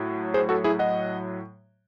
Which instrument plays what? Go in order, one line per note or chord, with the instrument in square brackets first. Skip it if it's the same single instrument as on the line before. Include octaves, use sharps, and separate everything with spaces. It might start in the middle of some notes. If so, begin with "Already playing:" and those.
Already playing: [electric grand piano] A2 F#3
G#4 C5
F#4 A4
E4 G#4
D#5 F#5